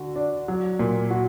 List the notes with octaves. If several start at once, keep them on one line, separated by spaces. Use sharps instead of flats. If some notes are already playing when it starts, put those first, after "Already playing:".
Already playing: D3 F#4
D4
F#3
A#2
F#4